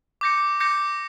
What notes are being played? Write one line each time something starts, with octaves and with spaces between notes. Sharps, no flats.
D6 G6 A#6 C#7
D6 G6 A#6 C#7